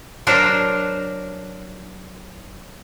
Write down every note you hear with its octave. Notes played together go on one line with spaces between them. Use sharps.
F#3 D4 A#4 C5